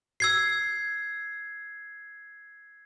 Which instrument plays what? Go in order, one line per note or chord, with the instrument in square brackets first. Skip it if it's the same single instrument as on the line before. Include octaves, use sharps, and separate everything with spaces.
[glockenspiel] E6 G#6 C7